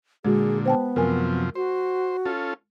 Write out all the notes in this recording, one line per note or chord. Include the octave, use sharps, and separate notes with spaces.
A#2 D3 G#3 F#4 G#4
B3 C5 G5 A5
F#2 C3 F3 A#4 G#5
F#4 C5
C#4 F4 A4